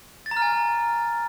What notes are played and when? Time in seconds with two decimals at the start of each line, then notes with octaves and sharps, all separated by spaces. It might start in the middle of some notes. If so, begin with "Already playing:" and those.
0.26 A6
0.31 A#5
0.37 F6
0.42 G#5